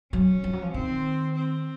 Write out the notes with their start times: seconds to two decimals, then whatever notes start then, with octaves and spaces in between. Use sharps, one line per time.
0.13 F#3 C#4
0.44 F3
0.53 F#3
0.62 F3
0.74 D#3 C4
1.36 C4